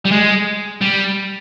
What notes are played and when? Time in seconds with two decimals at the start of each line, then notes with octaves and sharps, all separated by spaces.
0.05 G3
0.11 G#3
0.81 G3